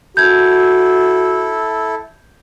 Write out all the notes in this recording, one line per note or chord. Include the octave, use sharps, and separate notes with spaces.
E4 F#4 A4 G6 G#6